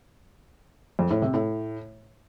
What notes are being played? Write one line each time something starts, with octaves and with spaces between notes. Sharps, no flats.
F2
A2
C3
A2